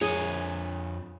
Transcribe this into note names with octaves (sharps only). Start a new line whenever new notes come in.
F2 G#4 C#5